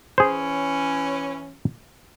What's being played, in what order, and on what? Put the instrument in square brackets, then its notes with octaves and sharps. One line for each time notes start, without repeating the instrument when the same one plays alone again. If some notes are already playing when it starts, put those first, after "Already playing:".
[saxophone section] E3 C#4 [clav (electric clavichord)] G#4 C5